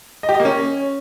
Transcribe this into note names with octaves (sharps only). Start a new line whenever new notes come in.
D#5
G4
D#5
A#3
C#4